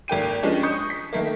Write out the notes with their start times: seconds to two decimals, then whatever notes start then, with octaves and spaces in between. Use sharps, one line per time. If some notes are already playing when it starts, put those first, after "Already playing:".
0.08 G#1 A#3 G5 D#7
0.43 F3 G#3 C#4 D4
0.63 C#6 D#6 G6 C#7
0.90 B6
1.13 D#3 A3 A#3